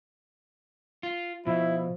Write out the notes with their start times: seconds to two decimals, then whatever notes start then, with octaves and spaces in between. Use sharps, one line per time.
1.03 F4
1.47 B2 F3 E4